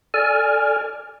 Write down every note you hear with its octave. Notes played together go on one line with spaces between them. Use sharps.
A4 D5 G#5 F6